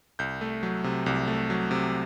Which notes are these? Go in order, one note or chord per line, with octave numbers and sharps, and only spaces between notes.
C2 G6
A3
F#3
C3
C2
A3
F#3
C3